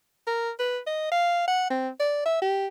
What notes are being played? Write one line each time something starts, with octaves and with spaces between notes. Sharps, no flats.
A#4
B4
D#5
F5
F#5
C4
D5
E5
G4